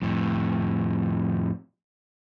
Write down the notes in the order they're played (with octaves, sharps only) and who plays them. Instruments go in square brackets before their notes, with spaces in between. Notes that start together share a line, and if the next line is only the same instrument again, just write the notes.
[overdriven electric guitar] F2 A2